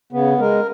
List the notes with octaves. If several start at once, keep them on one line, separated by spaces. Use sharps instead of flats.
C#3 B3
G#3 A#4